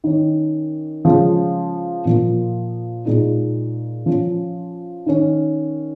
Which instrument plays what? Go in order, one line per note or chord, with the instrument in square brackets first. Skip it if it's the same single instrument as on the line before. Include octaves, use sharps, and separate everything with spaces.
[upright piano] D#3 C#4
C#3 F3 G#3 C#4
A#2 F3 A#3
A#2 G#3 D#4
F3 C#4
D#3 C#4